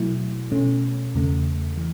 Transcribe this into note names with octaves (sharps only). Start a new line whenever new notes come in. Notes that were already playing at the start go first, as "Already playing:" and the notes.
Already playing: B2 F#3 A3 E4
B2 A3 C#4
E2 C#3 A3
E3